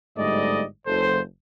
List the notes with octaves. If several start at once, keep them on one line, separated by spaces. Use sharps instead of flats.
G1 G#2 G3 A3 D5 D#5
F#1 A4 C5